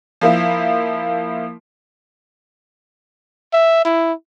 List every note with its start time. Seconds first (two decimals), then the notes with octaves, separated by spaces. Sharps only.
0.21 F3 A#3 E4
3.53 E5
3.85 E4